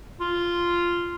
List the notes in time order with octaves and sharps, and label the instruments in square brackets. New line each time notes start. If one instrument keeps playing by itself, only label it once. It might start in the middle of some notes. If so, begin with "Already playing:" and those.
[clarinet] F4